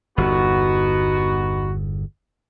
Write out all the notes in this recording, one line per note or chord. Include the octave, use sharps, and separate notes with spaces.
G1 E2 B3 D#4 F#4